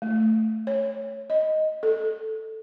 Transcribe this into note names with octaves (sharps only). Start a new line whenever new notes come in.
A3
C#5
D#5
A4